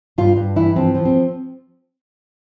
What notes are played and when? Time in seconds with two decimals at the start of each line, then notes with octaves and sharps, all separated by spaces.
0.18 G2 F4
0.37 G2
0.56 E3 E4
0.76 F3 C4
0.95 F3
1.05 C4